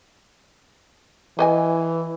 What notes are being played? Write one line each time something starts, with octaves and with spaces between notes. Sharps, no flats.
E3 B4 D#5 G#5